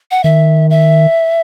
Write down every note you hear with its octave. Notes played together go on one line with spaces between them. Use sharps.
F#5
D#3 E5
E5